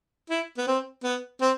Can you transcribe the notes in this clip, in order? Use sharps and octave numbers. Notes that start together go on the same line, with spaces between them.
E4
B3
C4
B3
C4